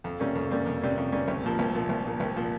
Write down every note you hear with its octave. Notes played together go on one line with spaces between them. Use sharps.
F2
C3 G3 A#3 C#4
F2
C3 G3 A#3 C#4
F2
C3 G3 A#3 C#4
F2
C3 G3 A#3 C#4
C2
A#2 F3 A#3
C2
A#2 F3 A#3
C2
A#2 F3 A#3
C2
A#2 F3 A#3